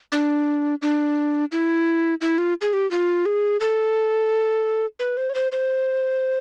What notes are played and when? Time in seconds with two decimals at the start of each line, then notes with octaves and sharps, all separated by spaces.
0.12 D4
0.82 D4
1.52 E4
2.21 E4
2.38 F4
2.61 G#4
2.73 G4
2.91 F4
3.26 G#4
3.60 A4
4.99 B4
5.17 C5
5.30 C#5
5.35 C5
5.52 C5